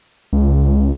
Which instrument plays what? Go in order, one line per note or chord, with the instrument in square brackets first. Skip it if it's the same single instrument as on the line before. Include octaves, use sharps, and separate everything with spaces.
[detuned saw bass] C#2